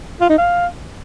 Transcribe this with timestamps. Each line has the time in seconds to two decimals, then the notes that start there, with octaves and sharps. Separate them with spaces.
0.21 F4
0.30 D#4
0.38 F5